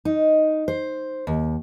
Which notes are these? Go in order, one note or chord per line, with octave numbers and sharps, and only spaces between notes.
D#4
C5
D#2